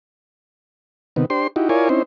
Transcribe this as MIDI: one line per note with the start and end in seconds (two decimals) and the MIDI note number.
1.16 1.25 48
1.16 1.25 51
1.16 1.25 59
1.30 1.47 62
1.30 1.47 67
1.30 1.47 72
1.30 1.47 84
1.56 1.69 63
1.56 1.69 64
1.56 1.69 66
1.56 1.69 67
1.69 1.89 64
1.69 1.89 65
1.69 1.89 70
1.69 1.89 73
1.69 1.89 74
1.69 1.89 80
1.89 2.02 60
1.89 2.02 61
1.89 2.02 63
1.89 2.02 64
1.89 2.02 72